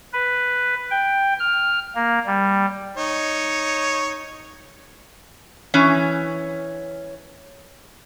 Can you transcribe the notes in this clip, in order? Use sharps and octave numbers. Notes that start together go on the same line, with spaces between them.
B4
G5
F6
A#3
G3
D#4 C#5
E3 C#4